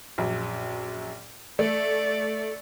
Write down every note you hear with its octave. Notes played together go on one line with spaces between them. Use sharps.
A#1 F#2
A3 D5